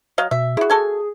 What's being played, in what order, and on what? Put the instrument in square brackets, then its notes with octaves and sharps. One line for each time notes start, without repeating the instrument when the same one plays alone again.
[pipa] F#3 D#5 F5
[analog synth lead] B2 [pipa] E5
[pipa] E4 F#4 [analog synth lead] G#4
[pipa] F#4 A4 G#5